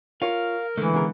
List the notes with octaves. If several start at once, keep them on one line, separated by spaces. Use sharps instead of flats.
F4 A#4 C#5 F5
D3 E3 G#3 A3
C#3 B3 G#4 A#4